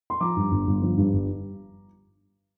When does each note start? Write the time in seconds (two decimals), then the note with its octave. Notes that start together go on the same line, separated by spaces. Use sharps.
0.10 C6
0.20 F3 A#5 D6
0.36 G2
0.51 G1
0.67 G1
0.82 F3
0.97 G2
1.13 G1